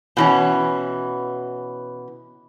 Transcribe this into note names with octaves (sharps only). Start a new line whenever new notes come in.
B2 E3 C#4